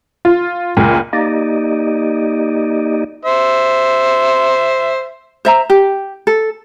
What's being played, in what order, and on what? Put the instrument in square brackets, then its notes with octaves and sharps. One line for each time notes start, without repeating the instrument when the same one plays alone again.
[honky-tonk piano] F4
C#2 A#2
[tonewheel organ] A#3 D#4 G4 D5 D#5
[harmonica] C5 E5
[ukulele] C5 E5 A#5
G4
A4